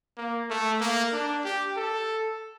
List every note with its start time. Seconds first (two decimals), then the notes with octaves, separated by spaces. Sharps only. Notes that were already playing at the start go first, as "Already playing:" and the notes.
0.17 A#3
0.50 A3
0.81 A#3
1.13 D4
1.44 G4
1.76 A4